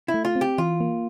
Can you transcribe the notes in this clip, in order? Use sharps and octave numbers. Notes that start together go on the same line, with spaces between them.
E4
A3
F4
C4
G4
E3 F4
A#3